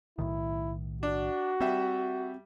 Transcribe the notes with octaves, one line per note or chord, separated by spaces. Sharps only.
B1 A2 D#3 E4
D4 F#4
G3 C4 E5